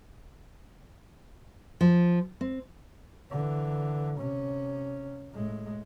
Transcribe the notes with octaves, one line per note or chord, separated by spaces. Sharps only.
F3
C4
D3 E3
C3 C#4
A2 G#3